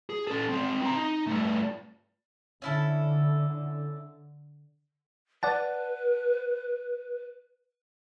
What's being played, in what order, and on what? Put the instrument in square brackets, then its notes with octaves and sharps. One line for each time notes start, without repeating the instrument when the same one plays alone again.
[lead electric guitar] G#4
C#4 A4
G#3 C4
C4 A#5
D#4
G2 A3
[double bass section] D3 [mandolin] C#4 E4 A4
[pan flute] B4 [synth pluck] D5 F#5 A5